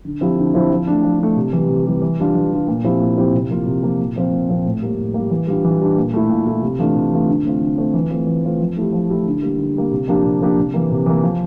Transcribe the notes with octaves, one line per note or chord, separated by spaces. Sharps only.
D3
F3 C4 E4 G4
D3
F3 C4 E4 G4
F3
A3 D4
F3
A3 D4
C3
E3 G3
C3
E3 G3
E3
G3 D4 F4
E3
G3 D4 F4
A#2
F3 C4 E4 G4
A#2
F3 C4 E4 G4
C3
F3 A#3 F4
C3
F3 A#3 F4
A#2
F3 C4 F4
A#2
F3 C4 F4
A2
G3 A#3
A2
G3 A#3
E3
G3 D4 F4
E3
G3 D4 F4
A#2
A3 E4
A#2
A3 E4
C3
E3 A3 D4 F4
C3
E3 A3 D4 F4
D3
A3 C4 F4
D3
A3 C4 F4
E3
A3 C4 F4
E3
A3 C4 F4
F3
A3 E4 G4
F3
A3 E4 G4
D3
G3 A#3
D3
G3 A#3
C3
F3 A#3 D4 G4
C3
F3 A#3 D4 G4
C3
E3 A#3
C3
E3 A#3
F3